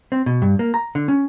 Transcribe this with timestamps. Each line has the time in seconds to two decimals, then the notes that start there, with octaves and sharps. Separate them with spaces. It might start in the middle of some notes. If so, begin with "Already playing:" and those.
0.12 C4
0.26 B2
0.42 G2
0.59 A#3
0.74 A#5
0.95 D3
1.08 C#4